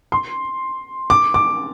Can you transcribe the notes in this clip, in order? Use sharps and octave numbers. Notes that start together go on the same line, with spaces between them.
C6
D6
D6